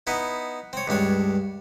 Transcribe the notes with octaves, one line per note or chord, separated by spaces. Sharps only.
B3 D#4 E4
C4 C#5
C#2 G2 D4 C#5